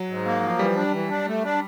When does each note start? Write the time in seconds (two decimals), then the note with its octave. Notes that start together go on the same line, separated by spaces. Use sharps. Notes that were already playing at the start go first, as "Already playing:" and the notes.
Already playing: F#3
0.08 G#2
0.25 A#3
0.42 F3
0.59 E3 G3
0.76 D4
0.93 E3
1.09 D4
1.27 A3
1.43 D4